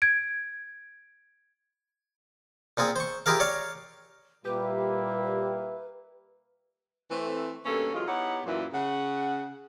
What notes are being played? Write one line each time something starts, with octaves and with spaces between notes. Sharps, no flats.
G#6 D7
A#2 C4 F4 G#4
C5 C#6
E4 F4 G4 G#4 A#4 F5
C#5 D5 F5
A#2 G3 A#3 E4 G4 B4
E3 A3 C4
G2 B2 A#3 C#4 A4
C3 E3 F#3 G#3 F4
B3 D#4 E4 G4 C#5 F#5
F#2 A#2 E3
C#3 F#5